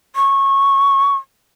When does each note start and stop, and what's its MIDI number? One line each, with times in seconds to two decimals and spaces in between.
0.16 1.15 85